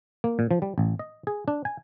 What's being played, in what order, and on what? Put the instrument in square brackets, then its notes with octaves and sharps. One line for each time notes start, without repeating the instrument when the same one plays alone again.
[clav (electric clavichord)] A#3
A#2
F3
G3
A1
D#5
G#4
D4
G#5